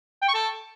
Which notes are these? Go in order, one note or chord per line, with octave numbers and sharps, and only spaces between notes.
G5
C#6
A4